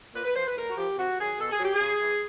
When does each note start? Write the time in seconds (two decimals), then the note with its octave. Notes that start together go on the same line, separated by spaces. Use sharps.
0.14 A#2 B4
0.25 B4
0.34 F3 C5
0.46 B4
0.55 A2 A#4
0.69 F#4
0.76 F3 G4
0.97 C3 F#4
1.18 D#3 F#3 G#4
1.39 B2 A4
1.51 G#4
1.59 F#3 G4
1.73 G#4
1.80 C#3
2.02 E3